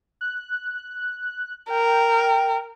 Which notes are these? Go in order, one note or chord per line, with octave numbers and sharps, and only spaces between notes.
F#6
A#4 G5